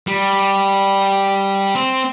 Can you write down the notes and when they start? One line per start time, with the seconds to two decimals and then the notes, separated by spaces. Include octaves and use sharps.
0.07 G3
1.75 C4